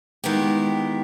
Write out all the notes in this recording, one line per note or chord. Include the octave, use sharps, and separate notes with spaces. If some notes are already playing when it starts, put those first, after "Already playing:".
D#3 G#3 B3 E4 G4